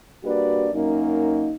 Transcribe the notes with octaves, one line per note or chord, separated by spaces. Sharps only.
G3 A#3 D4 F#4 B4 D5
F#2 F#3 A#3 D#4